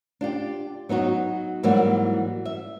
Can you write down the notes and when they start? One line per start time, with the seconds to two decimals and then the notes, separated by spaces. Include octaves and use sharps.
0.21 D4 F4 G4
0.89 F#3 B3 D#4 F#4
1.63 G#2 E3 F#3 G3 A#3 F#4
2.45 E5